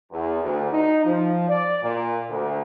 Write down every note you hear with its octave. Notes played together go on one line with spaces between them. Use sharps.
E2
D2
D#4
F3
D5
A#2
D2